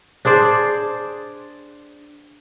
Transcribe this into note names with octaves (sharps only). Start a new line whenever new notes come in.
D4 G#4 C5 D5